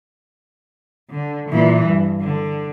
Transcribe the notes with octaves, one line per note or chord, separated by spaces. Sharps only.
D3
A#2 E3
G2
D3